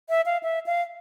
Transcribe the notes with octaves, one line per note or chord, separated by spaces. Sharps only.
E5
F5
E5
F5